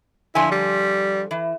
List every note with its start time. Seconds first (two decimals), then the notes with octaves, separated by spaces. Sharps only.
0.35 D3 F3 E4 G#5
0.52 G3
1.31 E3